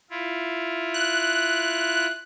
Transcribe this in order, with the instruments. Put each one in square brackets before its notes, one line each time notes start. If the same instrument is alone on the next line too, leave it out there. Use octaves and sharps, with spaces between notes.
[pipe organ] E4 F4
[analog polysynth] F#6